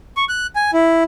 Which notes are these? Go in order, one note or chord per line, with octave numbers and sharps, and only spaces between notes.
C#6
F#6
G#5
E4